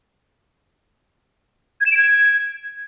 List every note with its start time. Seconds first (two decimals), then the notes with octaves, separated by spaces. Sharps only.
1.81 G#6
1.86 E7
1.92 D7
1.97 G#6